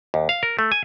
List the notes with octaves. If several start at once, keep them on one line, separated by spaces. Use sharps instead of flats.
D#2
F5
A#4
A3
G#5